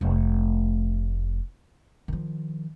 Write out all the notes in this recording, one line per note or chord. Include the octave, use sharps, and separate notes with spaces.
F1 A3
D#3 F3